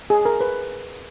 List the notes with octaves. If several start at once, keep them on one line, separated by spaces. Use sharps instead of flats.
G#4
A#4
B4